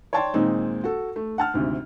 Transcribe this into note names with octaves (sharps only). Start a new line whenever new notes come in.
C#5 D5 G5 A5 C6
A#2 D#3 G#3 C4 D#4
F#4 A4
A3
F#5 A5 F6
G#1 D2 C3